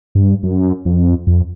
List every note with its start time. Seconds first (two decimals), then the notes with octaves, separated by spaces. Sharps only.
0.15 G2
0.43 F#2
0.85 F2
1.27 F2